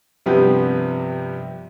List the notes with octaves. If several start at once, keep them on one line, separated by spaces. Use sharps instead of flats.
G2 C3 F3 B3 G4